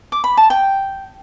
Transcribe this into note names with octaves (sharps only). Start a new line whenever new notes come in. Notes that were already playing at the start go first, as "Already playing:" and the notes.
D6
B5
A5
G5